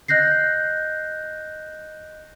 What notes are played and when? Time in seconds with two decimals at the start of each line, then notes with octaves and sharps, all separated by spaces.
0.08 D#5 F#6 G6 A#6 C7